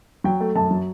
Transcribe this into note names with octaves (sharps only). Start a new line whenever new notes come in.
F#3 G5
A3
F#2 A5
F#3